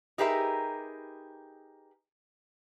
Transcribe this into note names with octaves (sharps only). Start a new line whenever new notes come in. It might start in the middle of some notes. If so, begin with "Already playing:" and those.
D#4 G4 G#4 A#4 B4 E5